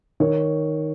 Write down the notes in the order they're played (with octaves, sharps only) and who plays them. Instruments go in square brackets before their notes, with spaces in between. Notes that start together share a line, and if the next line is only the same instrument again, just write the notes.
[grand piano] D#3 C#5